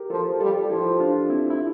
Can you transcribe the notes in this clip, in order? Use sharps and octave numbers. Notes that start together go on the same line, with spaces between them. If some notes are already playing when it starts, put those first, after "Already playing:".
Already playing: G4 A#4
F3 F4 A4
G3 F4 A4
F3 E4 G4
D4 F4
C4 E4
E4